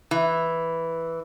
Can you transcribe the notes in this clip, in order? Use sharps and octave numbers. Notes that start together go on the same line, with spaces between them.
E3